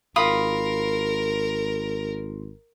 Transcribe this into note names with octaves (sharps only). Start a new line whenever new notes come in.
G#1 F4 A#4 B5 D#6